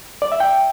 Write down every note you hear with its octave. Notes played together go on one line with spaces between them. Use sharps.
D5
E5
G5